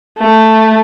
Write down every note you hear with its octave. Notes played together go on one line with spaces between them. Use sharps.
A3